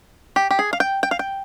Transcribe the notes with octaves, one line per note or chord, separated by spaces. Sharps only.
G4
G4
G#4
F5
G5
G5
F5
G5